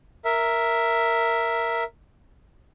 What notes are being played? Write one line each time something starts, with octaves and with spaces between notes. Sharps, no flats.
A#4 E5